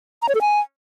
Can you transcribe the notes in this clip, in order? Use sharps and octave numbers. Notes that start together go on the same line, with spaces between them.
A#5
C#5
A4
G#5